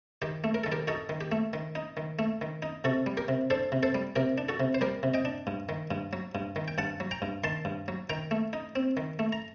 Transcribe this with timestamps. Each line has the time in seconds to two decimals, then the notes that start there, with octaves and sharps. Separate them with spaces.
0.22 D#3 G4
0.44 A3
0.54 A#4
0.64 D#3 A4
0.72 G4 A#4
0.88 D#4 F#4 A4
1.09 D#3
1.21 G4
1.32 A3
1.53 D#3
1.75 D#4
1.97 D#3
2.19 A3
2.41 D#3
2.62 D#4
2.84 C3 F#4 A4
3.06 G3
3.17 G4 A#4
3.28 C3
3.50 D4 A4 C5
3.72 C3
3.83 A4 C5
3.95 G3
4.16 C3 G4 A#4
4.38 D4
4.49 F#4 A4
4.60 C3
4.74 C5
4.81 G3 G4 A#4
5.03 C3
5.14 D#5 G5
5.25 D4
5.47 G2
5.69 D#3
5.91 G2
6.13 F#3
6.35 G2
6.56 D#3
6.68 G5
6.78 G2 F#5 A5
7.00 F#3
7.11 G5 A#5
7.22 G2
7.44 D#3 A5 C6
7.65 G2
7.88 F#3
8.10 D#3 G5 A#5
8.31 A3
8.53 D#4
8.76 C4
8.97 D#3
9.19 A3
9.32 A#5